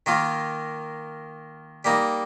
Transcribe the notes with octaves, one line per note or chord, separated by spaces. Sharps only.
D#3 A#3 F4
G3 A#3 D#4